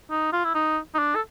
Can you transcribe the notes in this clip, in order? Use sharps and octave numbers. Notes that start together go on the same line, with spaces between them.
D#4
F4
E4
D#4
D#4
D4
A4